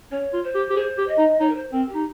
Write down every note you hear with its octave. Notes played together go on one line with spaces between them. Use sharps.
C#4 C#5
F4
C5
G4
G4
G#4 C5
G4
D#5
D#4
D#4 C#5
A#4
C5
C4 A#4
G4
D#4